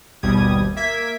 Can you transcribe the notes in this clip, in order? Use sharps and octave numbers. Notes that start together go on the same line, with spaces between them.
G#1 D#2 B2 G3 D#6 G#6
A#3 E5 G#6 B6 D7